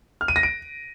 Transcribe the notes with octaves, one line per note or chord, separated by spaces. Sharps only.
F6
D#7
A#6
D7